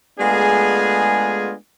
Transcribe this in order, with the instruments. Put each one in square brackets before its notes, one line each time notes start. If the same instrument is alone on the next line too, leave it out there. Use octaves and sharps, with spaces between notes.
[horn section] G#3 A3 B3 D4 F4 G#4